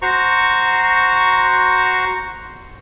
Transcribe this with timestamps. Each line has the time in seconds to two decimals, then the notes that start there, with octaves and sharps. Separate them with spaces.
0.02 F#4 C5 A#5 C#6